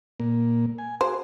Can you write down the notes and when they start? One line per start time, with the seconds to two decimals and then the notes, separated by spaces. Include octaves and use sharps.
0.20 A#2 A#3
0.78 G#5
1.01 F#4 G#4 C5